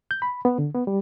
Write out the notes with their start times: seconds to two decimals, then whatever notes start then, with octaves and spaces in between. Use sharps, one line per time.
0.11 G6
0.22 B5
0.45 B3
0.58 D3
0.74 B3
0.87 G3